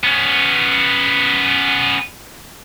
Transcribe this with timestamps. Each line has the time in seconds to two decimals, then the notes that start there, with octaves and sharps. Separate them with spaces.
0.04 B3 C#4